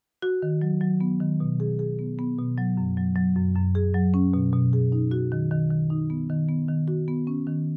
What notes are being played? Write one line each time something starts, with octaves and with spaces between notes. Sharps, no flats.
F#4
D#3
F#3
F#3
B3
D#3
B2
G#4
G#4
B3
B3
B2
F#3
F#2
F#3
F#3
F#2
F#2
G#4
F#3
C#4
B2
B2
G#4
D#4
F#4
D#3
D#3
D#3
D#4
B3
D#3
B3
D#3
F#4
B3
C#4
D#3